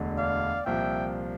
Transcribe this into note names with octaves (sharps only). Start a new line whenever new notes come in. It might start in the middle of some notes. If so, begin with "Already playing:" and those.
Already playing: E1 D2 D3
D5 F5
C2 A#2 F3 E5 G5